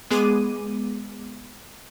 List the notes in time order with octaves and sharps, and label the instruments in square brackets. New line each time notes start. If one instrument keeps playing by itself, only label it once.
[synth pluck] G#3 B3 G#4 D6 D#7